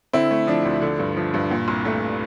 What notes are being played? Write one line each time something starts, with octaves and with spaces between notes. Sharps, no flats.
D3 C4 E4
A3
F3 D4
D2
D3
G2
F3
G2
A#2
C2
A3